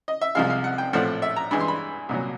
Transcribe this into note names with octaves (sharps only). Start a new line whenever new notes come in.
D#5
E5
C2 C3 F3 G#3 F5
F5
F#5
G5
A#1 A2 F3 A3 C4 F#5
E5
A#5
G2 E3 G#3 B5
C6
B5
C2 A#2 F#3